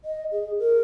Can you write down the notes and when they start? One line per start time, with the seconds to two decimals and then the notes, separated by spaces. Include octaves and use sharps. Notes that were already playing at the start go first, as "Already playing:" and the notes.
0.04 D#5
0.31 G#4
0.58 A#4